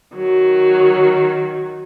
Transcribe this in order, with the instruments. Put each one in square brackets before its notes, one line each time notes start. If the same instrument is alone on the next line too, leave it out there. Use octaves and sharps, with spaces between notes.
[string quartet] D#3 F#3